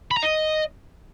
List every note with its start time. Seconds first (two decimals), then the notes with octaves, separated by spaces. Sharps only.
0.11 B5
0.17 A#5
0.23 D#5